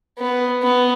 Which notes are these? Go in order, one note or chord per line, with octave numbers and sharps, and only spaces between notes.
B3
B3